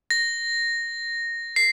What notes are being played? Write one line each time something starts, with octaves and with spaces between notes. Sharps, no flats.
A#6
C7